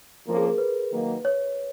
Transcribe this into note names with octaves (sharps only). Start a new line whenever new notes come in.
F2 F3 A#3 C#4
G#4
A#4
B4
D#3 F#3 A#3 D#4
C#5